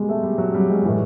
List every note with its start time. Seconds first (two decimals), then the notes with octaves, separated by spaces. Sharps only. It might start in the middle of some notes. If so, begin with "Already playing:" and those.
Already playing: B2 G3 G#3
0.09 A3
0.23 G3
0.38 F#3
0.54 G3
0.70 G#3
0.85 A2 E3 G#3